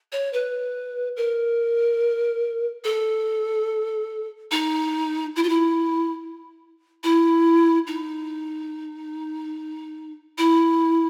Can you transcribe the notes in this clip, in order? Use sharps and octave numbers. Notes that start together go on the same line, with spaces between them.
C#5
B4
A#4
A4
D#4
E4
F4
E4
E4
D#4
E4